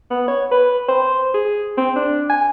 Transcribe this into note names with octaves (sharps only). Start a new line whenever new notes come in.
B3
C#5
B4
C5
G#4
C4
D4
G#5